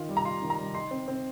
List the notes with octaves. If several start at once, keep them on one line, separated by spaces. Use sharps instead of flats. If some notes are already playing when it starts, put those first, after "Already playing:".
Already playing: D#3 D#4 F4
G3
A#5
F4 C6
D#3
A#5
G3
D#4 C6
C4
C4